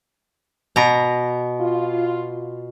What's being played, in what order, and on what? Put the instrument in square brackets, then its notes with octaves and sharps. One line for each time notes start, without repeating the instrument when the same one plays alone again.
[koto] B2 A#5
[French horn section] F4